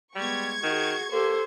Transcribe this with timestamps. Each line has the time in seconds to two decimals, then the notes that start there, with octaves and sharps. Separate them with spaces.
0.15 G3 G#3 B3 C#6 G#6
0.63 D#3 F#4 G#4
1.12 A#3 G4 A4 C5